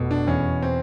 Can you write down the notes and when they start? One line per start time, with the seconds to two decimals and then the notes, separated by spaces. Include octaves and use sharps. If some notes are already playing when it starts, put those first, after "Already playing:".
Already playing: F1 B2
0.11 D4
0.27 E2 C#4
0.62 C4